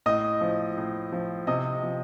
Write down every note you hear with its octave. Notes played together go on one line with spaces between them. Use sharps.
A2 D#5 D#6
F3
A2
F3
C3 D#5 D#6
F3